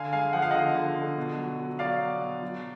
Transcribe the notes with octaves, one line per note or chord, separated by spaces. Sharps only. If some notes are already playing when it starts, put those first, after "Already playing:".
Already playing: D3 F5 G#5
G#3 F5 G#5
F3 F#5
F5
D3 D#5 F#5
D3
D3
B2
F#3
F#3
F#3 D5 F5
F#3
B2
F#3